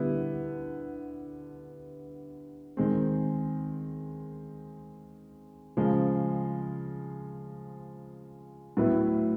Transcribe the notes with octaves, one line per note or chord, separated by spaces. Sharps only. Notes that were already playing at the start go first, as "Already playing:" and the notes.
Already playing: D3 G3 B3 E4
D#3 G#3 C4
C#3 F3 G#3
A2 F#3 B3 E4